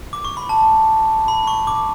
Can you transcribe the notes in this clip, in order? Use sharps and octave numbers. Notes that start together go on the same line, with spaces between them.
D6
C#6
B5
A5
B5
C#6
D6